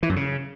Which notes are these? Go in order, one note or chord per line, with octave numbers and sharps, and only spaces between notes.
E3
F#2
C#3